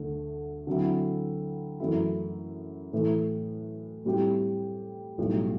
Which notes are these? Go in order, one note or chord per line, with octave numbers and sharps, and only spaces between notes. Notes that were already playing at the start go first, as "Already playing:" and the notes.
Already playing: D2 D3 A3
D3 F#3 C4 E4
F#2 E3 A3 E4
A2 E3 A3
A2 G3 C4 E4 G4
B1 A2 G3